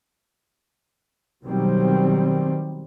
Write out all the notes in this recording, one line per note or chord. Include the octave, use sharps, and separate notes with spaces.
B2 D#3 F#3 G3 C4